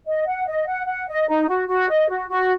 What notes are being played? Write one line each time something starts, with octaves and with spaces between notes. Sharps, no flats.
D#5
F#5
D#5
F#5
F#5
D#5
D#4
F#4
F#4
D#5
F#4
F#4